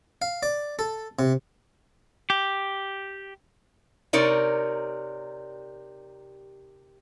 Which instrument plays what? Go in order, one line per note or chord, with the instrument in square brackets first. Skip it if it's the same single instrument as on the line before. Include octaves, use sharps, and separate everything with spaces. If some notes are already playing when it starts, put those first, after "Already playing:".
[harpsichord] F5
D5
A4
C3
[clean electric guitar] G4
[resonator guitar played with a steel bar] C3 D#4 A#4 C#5 D5